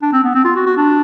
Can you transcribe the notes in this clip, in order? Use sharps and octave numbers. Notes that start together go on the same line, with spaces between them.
D4
C4
B3
C4
F4
F#4
F#4
D4